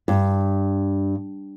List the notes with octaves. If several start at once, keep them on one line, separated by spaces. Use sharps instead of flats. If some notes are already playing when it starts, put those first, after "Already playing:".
G2